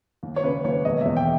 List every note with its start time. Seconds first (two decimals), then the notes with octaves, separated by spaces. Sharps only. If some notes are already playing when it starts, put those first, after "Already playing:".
0.23 D#2
0.36 C#5
0.44 C#3 B4
0.64 D#2 C#5
0.85 E1 D#5
1.01 E2 E5
1.17 G5